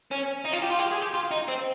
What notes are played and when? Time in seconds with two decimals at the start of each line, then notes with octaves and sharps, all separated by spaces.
0.12 C#4
0.45 D#4
0.53 F4
0.63 G4
0.71 F4
0.80 G4
0.92 G#4
1.03 G4
1.14 F4
1.31 D#4
1.48 C4